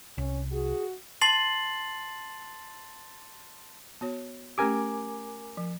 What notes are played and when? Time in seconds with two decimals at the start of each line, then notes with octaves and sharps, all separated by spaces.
0.18 C2 C#4
0.52 F#4 G#4
1.21 A5 C6 A6 C7 F#7
4.01 B3 F#4 C#5
4.58 A3 C#4 G4 A#4 G#5 D6
5.57 F3